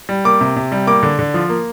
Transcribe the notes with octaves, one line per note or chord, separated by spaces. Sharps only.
G3
A#3 D6
C3
C3
G3
A#3 D6
D3
D3
F3
A#3